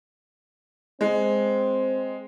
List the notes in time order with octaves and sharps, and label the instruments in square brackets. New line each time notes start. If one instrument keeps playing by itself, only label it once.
[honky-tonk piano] G#3 [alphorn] C4